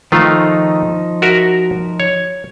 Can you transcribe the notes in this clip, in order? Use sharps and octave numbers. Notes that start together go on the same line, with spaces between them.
D#3 F3 A3 D#4 F4
F#4 A#4 E5
C#5